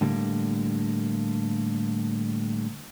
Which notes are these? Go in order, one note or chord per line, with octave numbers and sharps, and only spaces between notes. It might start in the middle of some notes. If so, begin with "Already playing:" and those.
A2 D3 G3 A#3